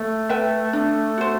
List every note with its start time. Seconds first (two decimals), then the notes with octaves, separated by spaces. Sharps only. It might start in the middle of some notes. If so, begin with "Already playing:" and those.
Already playing: A3
0.29 B4 E5 G5
0.73 D4
1.18 F#4 C5